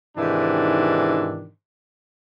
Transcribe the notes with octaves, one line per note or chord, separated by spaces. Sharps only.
G#2 C3 D#3 E3 D4